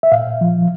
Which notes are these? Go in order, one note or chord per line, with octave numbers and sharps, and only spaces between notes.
E5
A#2 F5
F3